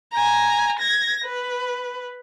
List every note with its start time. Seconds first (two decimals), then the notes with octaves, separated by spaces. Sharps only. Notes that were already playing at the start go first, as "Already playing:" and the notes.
0.13 G#5 A#5
0.79 G#6 A#6
1.25 B4